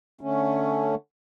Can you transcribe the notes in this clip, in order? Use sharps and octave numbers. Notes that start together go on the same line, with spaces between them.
D3 A3 C#4